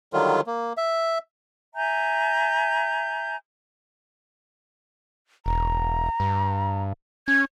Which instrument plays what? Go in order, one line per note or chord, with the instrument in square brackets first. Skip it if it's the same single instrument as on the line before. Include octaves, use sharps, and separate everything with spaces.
[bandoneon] D3 D#3 F#3 G3 F4
A#3
E5
[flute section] E5 G#5 A#5 G6
[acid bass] E1 [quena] A#5
[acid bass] G2
[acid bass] C#4 [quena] G#6